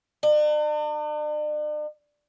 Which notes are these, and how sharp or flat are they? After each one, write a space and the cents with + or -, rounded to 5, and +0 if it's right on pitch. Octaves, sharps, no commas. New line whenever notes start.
D4 +45